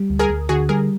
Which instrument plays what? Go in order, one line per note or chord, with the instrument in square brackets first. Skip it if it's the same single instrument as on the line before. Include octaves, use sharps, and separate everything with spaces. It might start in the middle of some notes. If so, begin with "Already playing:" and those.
Already playing: [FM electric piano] G3
D2
[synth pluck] G#4 A#4
[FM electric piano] D2
[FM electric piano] D3 [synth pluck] F#4 G#4
[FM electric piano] G3 [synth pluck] G#4 A#4